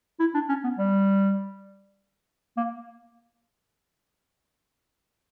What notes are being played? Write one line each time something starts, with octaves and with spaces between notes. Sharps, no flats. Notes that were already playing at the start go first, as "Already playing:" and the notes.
E4
D4
C#4
B3
G3
A#3